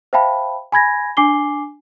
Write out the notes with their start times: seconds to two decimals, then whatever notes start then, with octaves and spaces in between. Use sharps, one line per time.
0.13 C5 E5 F5 G5 A5 B5
0.72 G#5 B5 G#6 A#6
1.17 D4 G#5 D6 C7 G7